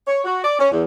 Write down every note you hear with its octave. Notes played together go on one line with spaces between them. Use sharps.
C#5
F#4
D5
C#4
E2